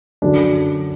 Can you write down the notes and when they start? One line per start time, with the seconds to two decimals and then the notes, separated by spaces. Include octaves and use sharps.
0.22 F#2 D3 F#3 D4